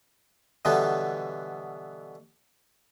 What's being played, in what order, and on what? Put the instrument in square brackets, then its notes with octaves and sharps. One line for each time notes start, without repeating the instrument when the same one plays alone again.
[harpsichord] B2 D3 E3 F#3 G3 B3